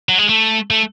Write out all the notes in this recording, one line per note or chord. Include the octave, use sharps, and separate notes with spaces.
F#3
G#3
A3
A3